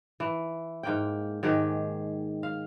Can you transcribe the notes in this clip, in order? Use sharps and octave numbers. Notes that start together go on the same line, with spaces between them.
E3
G#2 A#3 G5
G#2 D#3 G4 G#4
F5